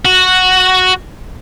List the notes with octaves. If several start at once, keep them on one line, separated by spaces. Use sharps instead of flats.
F#4